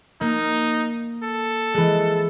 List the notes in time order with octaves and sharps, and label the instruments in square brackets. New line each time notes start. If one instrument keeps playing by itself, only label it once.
[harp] A#3 [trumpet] D#4
[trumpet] A4
[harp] E3 G#3